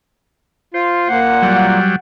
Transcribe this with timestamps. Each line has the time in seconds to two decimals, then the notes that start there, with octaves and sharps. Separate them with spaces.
0.74 F4 C5
1.09 A#2 A#3 F#5
1.42 F#3 G3